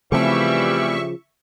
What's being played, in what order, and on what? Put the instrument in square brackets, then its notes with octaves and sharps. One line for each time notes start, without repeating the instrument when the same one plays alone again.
[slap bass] C#3 F3 [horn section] E3 G3 [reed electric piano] A3 C4 [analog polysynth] E5 C#6